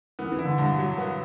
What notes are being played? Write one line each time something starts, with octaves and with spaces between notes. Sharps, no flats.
E3 B3
E3
E4
D3
G2 D3
F#3
B3